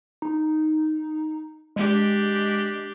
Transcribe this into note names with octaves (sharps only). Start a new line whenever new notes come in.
D#4
G#3 D4 G4